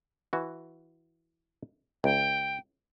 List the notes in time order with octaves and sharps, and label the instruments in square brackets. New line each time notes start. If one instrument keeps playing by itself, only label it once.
[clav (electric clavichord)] E3 F#4
[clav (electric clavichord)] C#2 [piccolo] G5